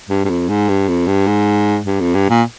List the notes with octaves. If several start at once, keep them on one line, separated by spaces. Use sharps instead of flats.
G2
G2
F2
G#2
G2
F2
G2
G#2
G2
F2
G2
A#2